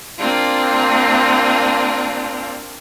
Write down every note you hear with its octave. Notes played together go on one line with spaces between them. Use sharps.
A#3 C4 D4 F4